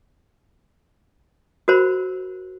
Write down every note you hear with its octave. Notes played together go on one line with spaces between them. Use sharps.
F#4 A#4 C5 B5